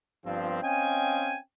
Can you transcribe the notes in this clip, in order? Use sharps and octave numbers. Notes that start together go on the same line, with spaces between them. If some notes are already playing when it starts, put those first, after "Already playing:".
G1 G2 F3 C4
C4 C#4 D#5 F5 G5 G#5